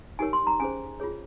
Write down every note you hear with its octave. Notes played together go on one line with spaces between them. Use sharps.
D#4 G4 A#4 C#5 G#5
C6
A#5
C#4 G#4 C5 G#5
F4 G#4 C#5